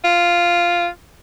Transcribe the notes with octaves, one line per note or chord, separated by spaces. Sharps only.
F4